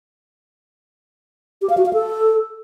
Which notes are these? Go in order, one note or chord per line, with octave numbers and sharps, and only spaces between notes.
G4
F5
F#4
F5
A4